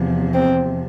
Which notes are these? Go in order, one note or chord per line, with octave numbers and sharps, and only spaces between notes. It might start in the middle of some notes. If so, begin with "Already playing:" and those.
Already playing: E2 C3 F3
C4